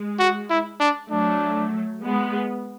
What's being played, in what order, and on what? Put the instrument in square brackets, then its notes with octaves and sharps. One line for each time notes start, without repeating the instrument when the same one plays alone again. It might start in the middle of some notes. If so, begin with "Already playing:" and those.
Already playing: [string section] G#3
[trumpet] F#4
E4
D4
[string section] F#3 A3 [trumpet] D4
[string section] G#3 B3